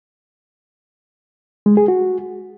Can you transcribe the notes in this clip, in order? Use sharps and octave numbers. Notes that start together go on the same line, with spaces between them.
G#3
G#4
F#4